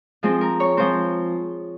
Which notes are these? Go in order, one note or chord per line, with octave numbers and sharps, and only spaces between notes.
F3 G#3 C4 G#4
A#4
C#5
F3 G#3 C4 C5